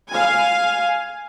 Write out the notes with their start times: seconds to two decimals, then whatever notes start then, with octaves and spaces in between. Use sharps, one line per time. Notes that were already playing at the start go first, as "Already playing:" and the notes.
0.11 F5 G#5